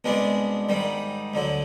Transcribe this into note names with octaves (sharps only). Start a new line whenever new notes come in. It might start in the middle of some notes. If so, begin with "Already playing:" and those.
C2 B2 G#3 B3 D4
G#2 D#3 G3
D2 D3 F#3